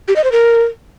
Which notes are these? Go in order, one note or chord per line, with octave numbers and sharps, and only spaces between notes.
G4
D#5
C5
A#4